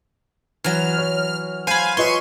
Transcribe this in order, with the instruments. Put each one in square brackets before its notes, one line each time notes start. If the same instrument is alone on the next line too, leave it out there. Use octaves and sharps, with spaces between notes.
[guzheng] E3 F#3 [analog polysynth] F6
[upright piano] C#5
[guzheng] C5 B5 [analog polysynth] F5 G#5
[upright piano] F4 B4 D#5 [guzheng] C#5 E5 [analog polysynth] C6 C#6 D#7